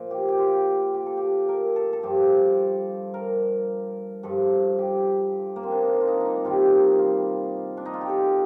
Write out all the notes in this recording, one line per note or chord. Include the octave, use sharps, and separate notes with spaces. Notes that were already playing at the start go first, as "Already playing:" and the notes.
Already playing: A#2 F3
G4
G4
F4
G4
A4
G4
A#4
A4
A4
G2 F3 G4
A#4
G2 F3 A4
G4
A#3
C4
D4
D#4
F4
F4
D#4
D4 D#4
C3 D#3 G3 F4
F4
D4
D#4
F4
G4
A4